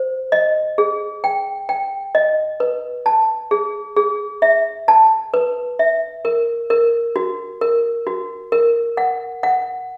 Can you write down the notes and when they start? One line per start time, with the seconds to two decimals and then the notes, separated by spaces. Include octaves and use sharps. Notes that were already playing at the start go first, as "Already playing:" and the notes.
Already playing: C5
0.32 D#5
0.78 G#4
1.24 G5
1.69 G5
2.15 D#5
2.60 B4
3.06 A5
3.51 G#4
3.96 G#4
4.42 E5
4.88 A5
5.34 B4
5.79 E5
6.25 A#4
6.70 A#4
7.16 F#4
7.61 A#4
8.07 F#4
8.52 A#4
8.97 F#5
9.43 F#5